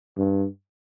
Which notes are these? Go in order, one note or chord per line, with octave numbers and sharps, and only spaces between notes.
G2